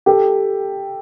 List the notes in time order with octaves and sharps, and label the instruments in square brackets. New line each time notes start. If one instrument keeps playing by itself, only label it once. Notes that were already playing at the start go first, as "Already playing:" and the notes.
[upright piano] G4 A4